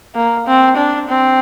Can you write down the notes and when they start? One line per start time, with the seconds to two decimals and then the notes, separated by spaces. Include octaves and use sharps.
0.16 A#3
0.47 C4
0.77 D4
1.08 C4